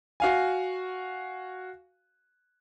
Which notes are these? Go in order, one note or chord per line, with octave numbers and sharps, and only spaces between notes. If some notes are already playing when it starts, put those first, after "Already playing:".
F#4 F5 G#5